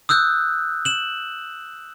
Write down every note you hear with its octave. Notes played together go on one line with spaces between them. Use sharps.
D#6 E6 F#6 G6
E7 F#7